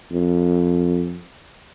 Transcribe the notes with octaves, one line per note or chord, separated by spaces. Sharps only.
F2